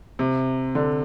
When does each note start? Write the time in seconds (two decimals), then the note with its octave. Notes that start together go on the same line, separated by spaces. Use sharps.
0.19 C3
0.75 D3